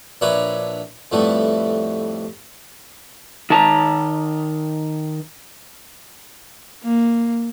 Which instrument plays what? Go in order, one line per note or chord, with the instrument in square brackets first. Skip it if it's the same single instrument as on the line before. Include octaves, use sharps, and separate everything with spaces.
[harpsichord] A#1 D4 E4 B4 C#5 A#5
F2 A2 G3 A3 B3
[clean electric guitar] D#3 A5 A#5
[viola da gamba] A#3